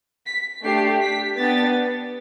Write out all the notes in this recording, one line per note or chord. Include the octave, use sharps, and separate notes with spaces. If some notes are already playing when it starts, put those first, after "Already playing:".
B6
A3 D4 G4 C7
B6
B3 D4 G4 A6